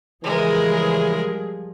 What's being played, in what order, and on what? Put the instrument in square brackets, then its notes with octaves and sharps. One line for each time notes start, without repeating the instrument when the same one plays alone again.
[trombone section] C#3 E3 [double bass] F3 G3 [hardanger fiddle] G#3 A#4 [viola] G#4